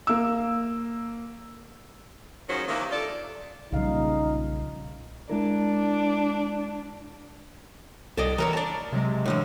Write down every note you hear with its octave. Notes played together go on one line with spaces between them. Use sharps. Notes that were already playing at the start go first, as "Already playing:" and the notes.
A#3 E6
G#2 D#3 F3 F#3 C#4 C5
C3 D#3 E3 A#3
F4 A4 D5
B1 A#2 C#3 F3 G3 D#4 F5
G#3 D4 E4 A#4
C2 A4 D5 D#5
E3 A#4 C#5 A#5
D5 A5
C3 F#3 G#3
A2 D3 E3